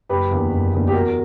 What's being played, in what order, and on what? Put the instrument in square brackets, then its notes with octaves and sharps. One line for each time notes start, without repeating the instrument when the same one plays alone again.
[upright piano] F#1 G4 B4
E2 D3 A#3
F#1
E2 D3 A#3
G4
E2 F#4 A#4